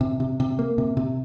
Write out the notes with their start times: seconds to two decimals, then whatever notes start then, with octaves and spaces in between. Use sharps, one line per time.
0.01 C3
0.20 C3
0.40 C3
0.59 A#3
0.78 C3
0.97 C3